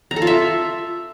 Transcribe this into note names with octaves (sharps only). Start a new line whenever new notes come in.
A#5
A4
F4
E5